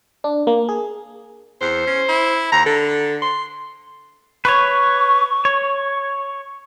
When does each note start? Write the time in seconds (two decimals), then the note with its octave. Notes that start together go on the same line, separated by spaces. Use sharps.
0.24 D4
0.47 A#3
0.69 G#4
1.61 E2 C5
1.87 C#4
2.08 E4
2.52 D#2 A#5
2.66 D3 A4
3.22 C6
4.45 B4 C#5 C#6
5.45 C#5